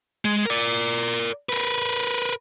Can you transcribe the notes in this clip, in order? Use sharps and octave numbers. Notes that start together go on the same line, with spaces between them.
G#3
A#4 D5
A#4 B4